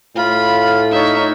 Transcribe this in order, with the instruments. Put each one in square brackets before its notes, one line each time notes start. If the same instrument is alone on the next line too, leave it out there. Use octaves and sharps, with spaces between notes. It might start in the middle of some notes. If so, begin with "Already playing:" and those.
[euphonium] A2 [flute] F4 [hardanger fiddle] B5
[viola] D#4 C#5 [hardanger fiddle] E5